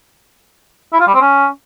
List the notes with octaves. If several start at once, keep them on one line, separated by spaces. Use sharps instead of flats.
E4
F4
G3
C4
C#4